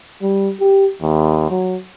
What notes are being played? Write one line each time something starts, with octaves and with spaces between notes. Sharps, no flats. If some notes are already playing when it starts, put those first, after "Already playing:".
G3
G4
D#2
F#3